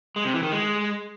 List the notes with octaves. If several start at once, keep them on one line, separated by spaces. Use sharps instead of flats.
G#3
C3
E3
D#3
G#3